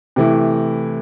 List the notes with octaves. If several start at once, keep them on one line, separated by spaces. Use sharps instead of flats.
C3 E3 A3 E4